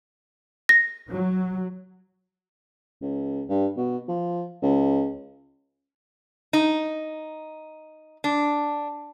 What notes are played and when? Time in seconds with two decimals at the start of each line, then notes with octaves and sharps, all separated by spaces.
0.69 A#6
1.11 F#3
3.02 C#2
3.49 G2
3.77 B2
4.08 F3
4.62 C#2
6.53 D#4
8.24 D4